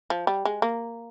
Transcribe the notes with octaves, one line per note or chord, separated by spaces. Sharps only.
F3
G3
G#3
A#3